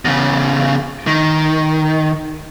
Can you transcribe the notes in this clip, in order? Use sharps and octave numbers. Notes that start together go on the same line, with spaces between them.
E2 C#3
D#3